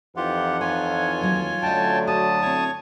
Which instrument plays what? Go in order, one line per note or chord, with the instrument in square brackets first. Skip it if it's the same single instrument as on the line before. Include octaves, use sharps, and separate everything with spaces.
[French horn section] F2 E3 D#4 [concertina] F4 G4 [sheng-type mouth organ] F#5
[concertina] F4 C#5 G#5 [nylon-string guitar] B4
[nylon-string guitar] D#2 F#3 A3
[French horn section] D3 F#3 A3 [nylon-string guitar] C#4 D#5 [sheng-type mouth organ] G5 A5
[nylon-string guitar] F#4 [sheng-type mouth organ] A5 D#6
[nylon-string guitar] C4 E4 [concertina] C#5 C#6